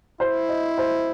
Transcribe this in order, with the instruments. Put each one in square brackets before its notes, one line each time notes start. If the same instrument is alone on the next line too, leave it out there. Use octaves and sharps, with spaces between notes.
[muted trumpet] E4 [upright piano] C5
[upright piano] D#5
C5